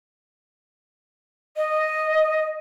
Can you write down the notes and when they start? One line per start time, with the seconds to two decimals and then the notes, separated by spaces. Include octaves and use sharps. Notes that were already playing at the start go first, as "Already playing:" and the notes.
1.57 D#5